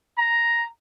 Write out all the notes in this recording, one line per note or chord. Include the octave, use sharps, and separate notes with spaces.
A#5